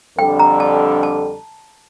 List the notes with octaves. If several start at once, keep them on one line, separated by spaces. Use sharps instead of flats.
F2 D3 G3 D4 A4 G5
A#5
A5
A5